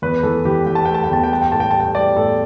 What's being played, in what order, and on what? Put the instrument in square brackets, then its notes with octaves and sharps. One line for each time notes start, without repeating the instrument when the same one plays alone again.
[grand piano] E2 B4
E3 A4
E3 G4
E3 G5
A5
A3 G5
A5
G5
E2 A5
G5
G3 A5
G5
A2 A5
G5
G3 A5
G5
G3 D5
A2 A4